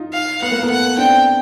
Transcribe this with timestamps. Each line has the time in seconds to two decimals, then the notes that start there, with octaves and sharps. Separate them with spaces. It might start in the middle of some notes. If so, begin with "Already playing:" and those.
Already playing: D#4 F4
0.13 F5
0.41 B3 F#5
0.52 A#3
0.63 A3 B3
0.70 F#5
0.97 C4 D4 G5